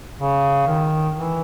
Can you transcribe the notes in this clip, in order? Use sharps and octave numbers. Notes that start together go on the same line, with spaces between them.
C#3
D#3
E3